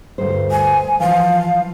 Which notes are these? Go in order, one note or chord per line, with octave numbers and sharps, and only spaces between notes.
D2 G2 C5
G#5
E3 F3 F5